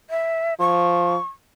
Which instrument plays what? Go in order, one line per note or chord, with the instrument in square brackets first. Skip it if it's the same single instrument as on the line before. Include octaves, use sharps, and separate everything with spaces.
[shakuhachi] E5
[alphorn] F3 [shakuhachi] C#6